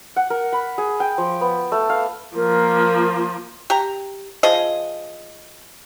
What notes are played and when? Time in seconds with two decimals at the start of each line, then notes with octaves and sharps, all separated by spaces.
0.16 F#5
0.30 A#4
0.53 B5
0.78 G#4
1.00 G5
1.18 F3
1.41 B3
1.72 A3
1.90 F5
2.36 F3 A#3 A#4
3.70 G4 A#5
4.43 F3 G#4 D#5